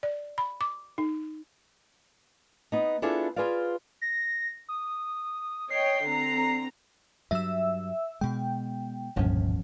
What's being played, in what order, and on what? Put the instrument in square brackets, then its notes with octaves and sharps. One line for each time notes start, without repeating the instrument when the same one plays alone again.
[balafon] D5
B5
D6
D#4
[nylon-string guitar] B3 D#4
B3 D4 E4 F4 G#4 A4
F4 G#4 B4 C5 D5 F5
[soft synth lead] A#6
D#6
[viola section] C#5 D#5 G5 [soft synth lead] C7
[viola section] D3 C4 A#5
[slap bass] G2 F#3 [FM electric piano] E5 E6
[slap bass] B2 G#3 [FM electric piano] G5
[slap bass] E1 F3 C#4 [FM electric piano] C#2 G2 A#2